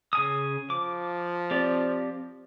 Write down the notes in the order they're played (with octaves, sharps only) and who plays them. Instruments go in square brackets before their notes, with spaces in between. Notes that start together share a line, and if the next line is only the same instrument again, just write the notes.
[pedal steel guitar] C#3 G#5 D#6
[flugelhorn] F3 [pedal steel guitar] D6
[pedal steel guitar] C4 G4 D5